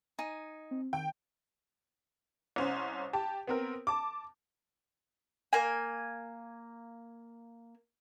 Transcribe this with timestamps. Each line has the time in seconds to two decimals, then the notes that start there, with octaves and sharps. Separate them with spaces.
0.19 D#4 G#5
0.71 C4
0.93 D#3 G5
2.56 C2 C#4 C5
3.13 G4 A5
3.47 B3 C4 A#4
3.87 A5 D6
5.53 A#3 G#5